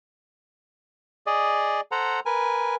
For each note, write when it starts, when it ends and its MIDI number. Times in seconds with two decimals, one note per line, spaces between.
1.26 1.81 68
1.26 1.81 74
1.26 1.81 75
1.92 2.20 69
1.92 2.20 72
1.92 2.20 78
1.92 2.20 82
2.26 2.76 70
2.26 2.76 71
2.26 2.76 80